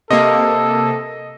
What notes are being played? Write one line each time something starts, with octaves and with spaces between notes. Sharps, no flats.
C3 A#3 A4 D#5